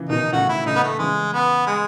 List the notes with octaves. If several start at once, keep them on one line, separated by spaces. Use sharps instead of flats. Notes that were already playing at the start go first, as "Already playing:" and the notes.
Already playing: C#3 E3
B2 D#3 D#4
A2 C#3 F#4
E4
A2 C#3 D#4
B3
A3
C#3 E3 G#3
B3
G#3